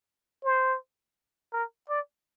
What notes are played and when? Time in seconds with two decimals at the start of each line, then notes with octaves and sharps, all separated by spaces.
0.44 C5
1.53 A#4
1.89 D5